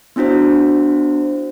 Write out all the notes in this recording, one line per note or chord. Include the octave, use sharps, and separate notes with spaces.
B3 D4 E4 F#4 C5